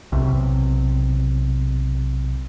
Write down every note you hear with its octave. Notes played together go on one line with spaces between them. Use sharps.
B1 C3